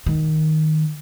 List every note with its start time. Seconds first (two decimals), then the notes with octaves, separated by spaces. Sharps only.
0.06 D#3